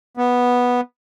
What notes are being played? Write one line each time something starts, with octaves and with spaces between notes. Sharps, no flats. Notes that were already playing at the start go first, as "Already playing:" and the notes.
B3